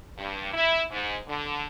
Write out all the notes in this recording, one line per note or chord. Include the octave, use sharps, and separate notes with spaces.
G2
E4
G#2
D3